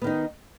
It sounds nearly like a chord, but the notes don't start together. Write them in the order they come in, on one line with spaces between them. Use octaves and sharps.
B3 D#3 D#4